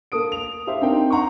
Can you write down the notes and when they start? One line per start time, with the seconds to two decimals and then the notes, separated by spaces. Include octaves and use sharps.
0.12 A#3 A4 D#6 D7
0.32 F7
0.67 G4 C5 E5 F5
0.82 C4 D4 D#4 A#4 G5
1.10 F#5 A#5 C6 C#6